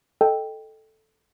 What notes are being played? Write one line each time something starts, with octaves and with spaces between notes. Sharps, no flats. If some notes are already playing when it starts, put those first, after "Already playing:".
A4 D#5 G5 A5